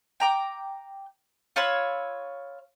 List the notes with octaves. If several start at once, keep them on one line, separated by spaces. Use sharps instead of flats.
G5 A#5 D6
F4 C#5 B5 E6